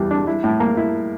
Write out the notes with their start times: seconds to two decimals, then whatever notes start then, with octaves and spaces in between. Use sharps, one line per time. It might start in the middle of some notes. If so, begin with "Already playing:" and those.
Already playing: E2 G3
0.11 D4
0.27 E4
0.44 A2
0.60 A#3
0.77 E4